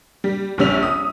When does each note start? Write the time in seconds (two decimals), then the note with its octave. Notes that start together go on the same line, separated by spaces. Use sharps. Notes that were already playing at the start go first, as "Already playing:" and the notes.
0.24 G3
0.58 A#1 C3 G3 C#4 E6 F7
0.83 D#6